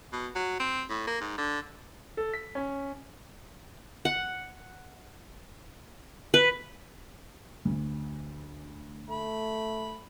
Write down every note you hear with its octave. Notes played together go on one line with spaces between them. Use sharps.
B2
F#3
C4
A2
A#3
G#2
D3
A4
B6
C#4
F#5
B4
D2
A3 B5